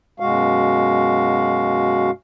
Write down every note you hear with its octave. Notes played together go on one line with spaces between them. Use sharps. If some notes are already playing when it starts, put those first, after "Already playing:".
F#2 B2 G#3 F#4 F5